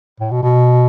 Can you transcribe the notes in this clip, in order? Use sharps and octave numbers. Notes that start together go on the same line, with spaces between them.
A2
B2
B2